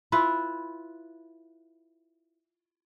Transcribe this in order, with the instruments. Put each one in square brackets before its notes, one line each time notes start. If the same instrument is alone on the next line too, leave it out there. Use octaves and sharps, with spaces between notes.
[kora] E4 F4 B4